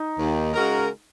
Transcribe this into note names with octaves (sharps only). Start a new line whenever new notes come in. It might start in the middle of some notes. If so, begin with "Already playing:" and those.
Already playing: D#4
D#2
C#3 G#3 F#4 A#4